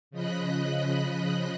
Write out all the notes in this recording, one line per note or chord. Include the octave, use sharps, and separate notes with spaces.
C#3 F3 D#5 B5 F#6